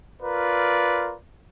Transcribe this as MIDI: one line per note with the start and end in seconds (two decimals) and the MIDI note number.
0.22 1.16 65
0.22 1.16 70
0.22 1.16 71
0.22 1.16 74